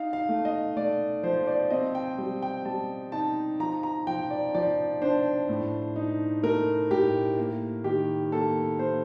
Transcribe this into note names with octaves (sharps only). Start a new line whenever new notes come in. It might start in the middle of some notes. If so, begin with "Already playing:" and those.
Already playing: D#4 F5
F5
A3
D#5
A3 D5
F3 C5
D5
C4 D#5
G5
G3
G5
G3 A5
D#4 A5
F3 A#5
A#5
F3 G5
D5
F3 D5
D4 C5
A2
D#4
A3 A#4
A2 G4
A#3
D#3 G4
A#3 A4
A#3 C5